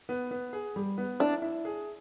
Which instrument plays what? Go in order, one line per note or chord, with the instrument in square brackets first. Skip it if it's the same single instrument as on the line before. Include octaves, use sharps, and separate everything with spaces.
[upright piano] B3
B3
G#4
G3
B3
[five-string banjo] D4 [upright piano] E4
[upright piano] E4
G#4